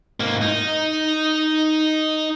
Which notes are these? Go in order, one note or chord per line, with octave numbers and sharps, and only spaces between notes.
G#2 A#3
D#4